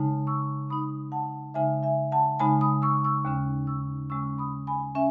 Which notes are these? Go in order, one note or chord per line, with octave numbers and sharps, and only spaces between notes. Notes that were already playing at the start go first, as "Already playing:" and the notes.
Already playing: C#3 G#3 D#4 A5
C#6 E6
C#3 G#3 D#4 B5 D#6
F#5 A5
C#3 G#3 D#4 E5 G#5
E5 G#5
F#5 A5
C#3 G#3 D#4 G#5 B5
B5 D#6
C#6 E6
C#6 E6
D#2 C#3 G#3 C#4
C#6 E6
D#2 C#3 G#3 C#4 C#6 E6
B5 D#6
G#5 B5
C#4 E5 G#5